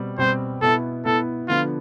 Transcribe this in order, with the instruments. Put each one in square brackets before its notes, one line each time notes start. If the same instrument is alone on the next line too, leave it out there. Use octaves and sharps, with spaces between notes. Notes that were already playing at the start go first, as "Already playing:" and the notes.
Already playing: [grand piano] B2 G3 C4
[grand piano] B2 G3 C4 [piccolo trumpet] C5
[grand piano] B2 B3 E4 [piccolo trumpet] A4
[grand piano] B2 B3 E4 [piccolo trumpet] A4
[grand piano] D3 F3 B3 D4 [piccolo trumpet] F4